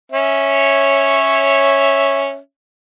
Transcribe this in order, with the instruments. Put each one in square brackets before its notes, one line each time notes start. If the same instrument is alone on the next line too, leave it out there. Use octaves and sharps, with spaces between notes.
[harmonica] C#4 C#5 E5